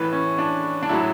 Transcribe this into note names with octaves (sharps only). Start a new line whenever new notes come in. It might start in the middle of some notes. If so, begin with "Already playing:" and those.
Already playing: A2 E3 B4
C#4
D4
D4
A2 F#3 E4